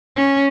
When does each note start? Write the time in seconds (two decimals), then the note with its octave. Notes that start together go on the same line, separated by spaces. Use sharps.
0.16 C#4